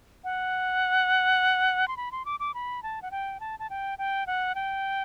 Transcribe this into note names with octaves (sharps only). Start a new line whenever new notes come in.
F#5
C6
B5
C6
D6
D6
B5
A5
F#5
G5
A5
A5
G5
G5
F#5
G5